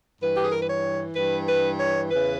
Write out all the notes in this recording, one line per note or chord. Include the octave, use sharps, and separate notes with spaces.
G2 E3 B4
G4
G#4
A#4
B4
C#5
G2 E3 B4
B4
C#5
E2 C#3 E3 B4